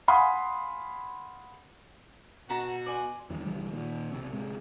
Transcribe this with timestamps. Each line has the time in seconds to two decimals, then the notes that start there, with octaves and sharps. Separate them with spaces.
0.08 F5 F#5 G#5 B5 C6 D#6
2.49 B2 F#4 F#5 A5 A#5
2.86 D5 G#5 C6
3.30 E2 G2 D#3 E3
3.45 C2 D3 E3 G3
3.72 A#2 D#3
4.12 B1 C3 C4
4.32 D1 G#2 C3 G#3